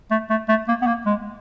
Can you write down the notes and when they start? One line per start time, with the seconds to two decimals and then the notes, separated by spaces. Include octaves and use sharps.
0.11 A3
0.30 A3
0.49 A3
0.68 A#3
0.82 B3
0.87 A#3
1.06 G#3